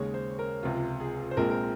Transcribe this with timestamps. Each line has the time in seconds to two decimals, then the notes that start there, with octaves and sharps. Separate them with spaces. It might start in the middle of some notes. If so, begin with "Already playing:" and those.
Already playing: D#2 C#3 G#3 C#5
0.14 C5
0.39 A#4
0.63 C#2 C3 F3 F4
1.00 G#4
1.31 C5
1.37 A#1 A#2 G#3 C4 A#4
1.50 A#4